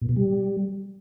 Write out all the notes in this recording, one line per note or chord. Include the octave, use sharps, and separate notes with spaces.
A#2
B2
G3